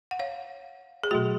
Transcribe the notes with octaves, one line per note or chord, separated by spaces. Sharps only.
F#5
C#5 F5
G#4
B2 F#3 A3 F#4